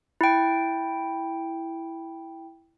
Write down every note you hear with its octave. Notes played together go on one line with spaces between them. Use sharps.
E4 G5